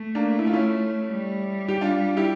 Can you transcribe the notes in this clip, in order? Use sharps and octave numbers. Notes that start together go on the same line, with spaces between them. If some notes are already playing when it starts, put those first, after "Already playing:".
Already playing: A3
A#3 D4
E4
F4
C#4 E4
G3
G4
D4 F4
E4 G4